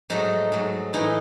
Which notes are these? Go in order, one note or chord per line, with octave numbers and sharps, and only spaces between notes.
G#2 F#3 A3 D#4
G#2 F#3 A3
A2 E3 A3 D#4